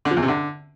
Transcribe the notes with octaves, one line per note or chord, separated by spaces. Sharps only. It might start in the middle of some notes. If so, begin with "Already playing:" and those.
D3
F3
E2
C3
D3